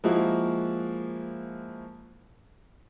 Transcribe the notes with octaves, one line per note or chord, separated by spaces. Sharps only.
F3 G#3 A#3 E4 F#4 A#4